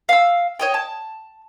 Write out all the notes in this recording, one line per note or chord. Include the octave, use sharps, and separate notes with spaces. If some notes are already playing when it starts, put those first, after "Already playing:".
F5 E6
C#5 D#5 G5
A5